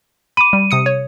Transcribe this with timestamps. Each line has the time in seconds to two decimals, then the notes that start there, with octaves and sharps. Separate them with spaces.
0.37 B5 D6 D#7
0.53 G3
0.71 C3 D#6 C#7
0.86 C#5